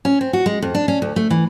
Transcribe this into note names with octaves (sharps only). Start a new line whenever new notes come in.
C#4
C4
F#4
G#3
F2
D4
C#4
D2
A3
E3